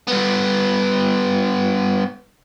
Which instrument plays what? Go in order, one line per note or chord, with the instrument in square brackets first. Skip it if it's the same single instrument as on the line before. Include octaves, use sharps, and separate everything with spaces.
[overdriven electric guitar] G2 B3